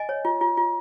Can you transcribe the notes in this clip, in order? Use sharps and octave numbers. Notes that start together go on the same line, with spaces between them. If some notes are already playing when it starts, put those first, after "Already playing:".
Already playing: D#5 G#5
C#5
F4
F4
F4